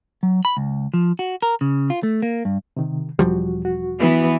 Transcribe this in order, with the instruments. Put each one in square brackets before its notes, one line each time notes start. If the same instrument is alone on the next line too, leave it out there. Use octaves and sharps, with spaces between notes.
[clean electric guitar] F#3
B5
C#2
F3
F#4
A#4
C#3
F4
A3
A#3
G2
[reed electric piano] C3 D#3
[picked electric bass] E1 F3 G3 [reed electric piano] F#4
[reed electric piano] F#4
[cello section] E3 B3